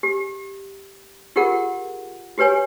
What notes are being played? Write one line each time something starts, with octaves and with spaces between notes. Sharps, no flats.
G4
F4 G4 G#4 A#4 F#5
F#4 G4 B4 C#5 G#5